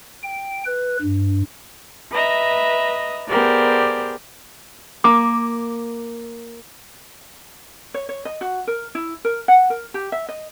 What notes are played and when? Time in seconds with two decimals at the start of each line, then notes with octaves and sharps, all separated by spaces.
0.23 G5
0.66 B4
1.02 G2
2.11 B4 D#5 E5 A#5
3.28 B3 G4 G#4 A#4 C5 D5
5.04 A#3 D6
7.94 C#5
8.09 C#5
8.25 D#5
8.41 F#4
8.67 A#4
8.95 E4
9.25 A#4
9.48 F#5
9.70 A#4
9.94 G4
10.12 E5
10.29 D#5